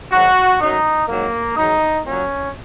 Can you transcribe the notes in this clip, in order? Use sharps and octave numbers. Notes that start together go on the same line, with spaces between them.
G#2 D#3 F#3 F#4
F#2 F#3 D#4
G#2 F#3 A#3
G#2 D#3 F#3 D#4
A#2 F#3 C#4